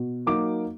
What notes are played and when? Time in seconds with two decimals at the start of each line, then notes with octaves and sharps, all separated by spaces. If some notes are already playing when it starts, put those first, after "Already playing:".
Already playing: B2
0.27 F#3 A#3 D#4 D6